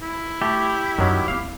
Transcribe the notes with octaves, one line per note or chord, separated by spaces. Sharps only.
E4
A3 G4
F#2 D#3 F#3
D#1 C4 F5